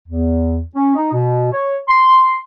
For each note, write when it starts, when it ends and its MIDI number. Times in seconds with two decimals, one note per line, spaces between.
0.07 0.61 40
0.75 0.94 61
0.94 1.10 63
1.12 1.49 47
1.53 1.76 73
1.87 2.32 84